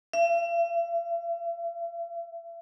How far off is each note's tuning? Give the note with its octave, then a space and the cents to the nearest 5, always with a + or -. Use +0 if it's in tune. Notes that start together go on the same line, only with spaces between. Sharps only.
E5 +40